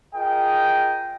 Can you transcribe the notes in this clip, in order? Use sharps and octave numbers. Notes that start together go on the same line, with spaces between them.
F4 G#4 A#4 D#5 G5